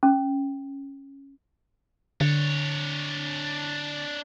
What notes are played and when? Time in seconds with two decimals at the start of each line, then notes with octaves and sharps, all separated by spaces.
0.03 C#4
2.21 D3 D4 C#5